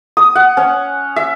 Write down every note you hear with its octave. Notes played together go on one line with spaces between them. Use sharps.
D#6
F#5
C#4
E5